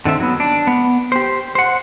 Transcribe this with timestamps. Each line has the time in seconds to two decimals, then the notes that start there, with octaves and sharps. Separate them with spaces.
0.05 D3 D#3 C4 E5
0.20 F#3 B3
0.40 D4
0.67 B3
1.12 G4 C5
1.55 C5 F#5